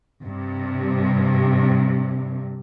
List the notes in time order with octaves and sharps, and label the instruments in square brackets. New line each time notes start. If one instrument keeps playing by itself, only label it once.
[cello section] G2 C3